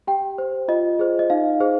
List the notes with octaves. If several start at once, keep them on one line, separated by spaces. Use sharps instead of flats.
G4 G5
C5
F4 D#5
G#4 C5
D#5
D#4 F5
G#4 C5